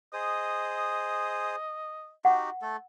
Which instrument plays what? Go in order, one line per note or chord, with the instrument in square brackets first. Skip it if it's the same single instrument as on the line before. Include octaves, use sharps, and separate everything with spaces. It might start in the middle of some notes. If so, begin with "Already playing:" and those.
[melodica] G#4 C5 D#6 [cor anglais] D#5
[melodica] D#4 F#4 G4 [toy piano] F#5
[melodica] A3 A4